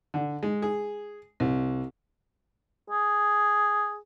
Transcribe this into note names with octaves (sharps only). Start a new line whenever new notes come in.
D3
G#3
G#4
C2
G#4